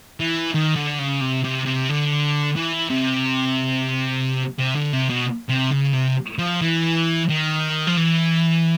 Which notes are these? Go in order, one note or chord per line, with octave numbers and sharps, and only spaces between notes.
E3
D#3
D3
C#3
C3
C3
C3
D3
E3
C3
C3
D3
C3
B2
C3
C#3
C3
F3
E3
D#3
F3
E3